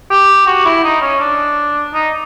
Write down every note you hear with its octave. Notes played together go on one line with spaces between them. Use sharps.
G4
F#4
E4
D#4
C#4
D4
D#4